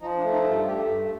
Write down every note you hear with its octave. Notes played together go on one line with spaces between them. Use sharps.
F3 D#4
D4
A3
D#4
G2
F4
A3 G4
G2